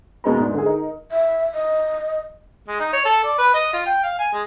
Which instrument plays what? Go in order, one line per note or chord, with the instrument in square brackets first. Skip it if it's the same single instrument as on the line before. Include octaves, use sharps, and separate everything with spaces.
[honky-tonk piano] D#2 B2 G#3 B4 A#5
G#2 D4
D3 G#4
D#4 A#4
[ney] E5
D#5
[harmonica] G#3
D#4
C#5
A4
D5
B4
D#5
F4
G5
F5
G#5
G#3